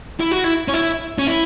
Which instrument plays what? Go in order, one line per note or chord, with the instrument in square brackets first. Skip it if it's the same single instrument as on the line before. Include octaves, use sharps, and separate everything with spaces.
[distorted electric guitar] E4
F#4
E4
C#4
E4
C#4
E4